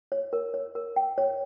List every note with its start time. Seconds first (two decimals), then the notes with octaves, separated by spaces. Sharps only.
0.12 C#5
0.33 A#4
0.54 C#5
0.75 A#4
0.96 G5
1.18 C#5